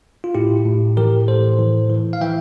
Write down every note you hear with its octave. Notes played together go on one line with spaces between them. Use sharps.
F4
A2 E4 G4
A2
E3 G4 A#4
A2 A4 C5
E3
E3
F5
E3 E5 G5